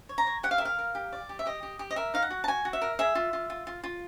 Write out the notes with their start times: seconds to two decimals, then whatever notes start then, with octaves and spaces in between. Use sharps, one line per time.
0.09 C#5
0.18 A#5
0.27 C#5
0.43 G4 F#5
0.51 F5
0.58 E5
0.61 A#4 F5
0.78 A#4
0.95 G4
1.12 D5
1.29 G4
1.39 E5
1.46 G4 D#5
1.63 G4
1.79 G4
1.91 D#5
1.96 A#4 E5
2.14 D#4 F5
2.22 F#5
2.30 F#4
2.44 A5
2.48 F#4 G#5
2.65 F#4
2.73 E5
2.82 A#4
2.99 G#4 E5
3.15 F4
3.33 F4
3.50 F4
3.67 F4
3.84 F4